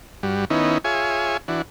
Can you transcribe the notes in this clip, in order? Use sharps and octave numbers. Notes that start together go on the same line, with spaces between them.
G2 G3 F#4
D#3 B3 C#4 D#4 E4
F4 G#4 C#5 E5 G#5
E3 D4 F#4